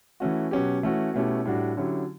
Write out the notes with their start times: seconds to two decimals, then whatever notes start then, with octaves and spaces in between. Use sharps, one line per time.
0.20 E3 A3 C#4 F#4
0.51 B2 F#3 C#4 G4
0.83 E3 A3 C#4 F#4
1.14 B2 A3 C#4 E4 G4
1.45 A2 G3 D4 F#4
1.77 D3 F#3 C#4 E4 G4